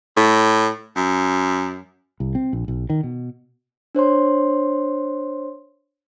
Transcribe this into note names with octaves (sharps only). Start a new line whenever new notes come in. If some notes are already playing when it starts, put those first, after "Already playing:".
A2
F#2
C2
C4
A#1
B1
D#3
B2
D4 C5 C#5 C6